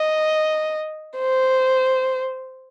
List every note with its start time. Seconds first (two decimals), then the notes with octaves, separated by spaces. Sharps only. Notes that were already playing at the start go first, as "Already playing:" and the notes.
Already playing: D#5
1.18 C5